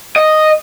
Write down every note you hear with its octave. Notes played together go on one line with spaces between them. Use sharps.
D#5